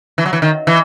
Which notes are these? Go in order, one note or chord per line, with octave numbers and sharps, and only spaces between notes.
E3
F#3
E3
D#3
E3